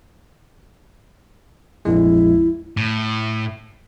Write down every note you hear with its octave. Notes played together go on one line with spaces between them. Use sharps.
A#1 F2 G#3 E4
A2